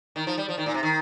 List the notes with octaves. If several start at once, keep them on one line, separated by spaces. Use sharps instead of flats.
D#3
F3
G3
F3
D#3
A#2
C3
D#3